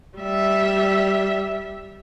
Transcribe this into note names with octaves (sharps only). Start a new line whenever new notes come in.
G3 E5